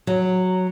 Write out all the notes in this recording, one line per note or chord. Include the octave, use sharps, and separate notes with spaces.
F#3